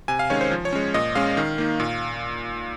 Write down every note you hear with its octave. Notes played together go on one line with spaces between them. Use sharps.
C3 G#5
F5
D#3 G#3 C#4 C#5
C5
F3
C#5
G#3 C#4
A#2 D#5
G#3 C#4 F5
D#3
A#3 D#4
A#2